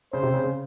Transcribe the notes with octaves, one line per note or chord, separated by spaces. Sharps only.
C#3 C5
C3
C#3
C#3